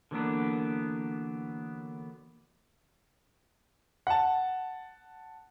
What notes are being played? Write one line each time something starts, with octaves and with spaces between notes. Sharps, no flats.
D3 E3 F#3 A#3 B3 D4
F#5 A5